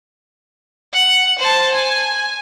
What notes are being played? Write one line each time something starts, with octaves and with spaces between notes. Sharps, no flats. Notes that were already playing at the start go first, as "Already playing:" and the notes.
F#5
C5 A5
G#5